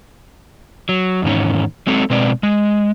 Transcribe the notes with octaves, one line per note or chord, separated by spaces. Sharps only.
F#3
E2 G#2 D#3 C#4
F#3 G#3 C4 A4
B2 G#3 C4 B4 D5
G#3